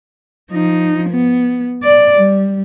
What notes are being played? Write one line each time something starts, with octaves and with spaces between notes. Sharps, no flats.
F3 D#4
B3
D5
G3